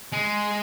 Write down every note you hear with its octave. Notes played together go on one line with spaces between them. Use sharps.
G#3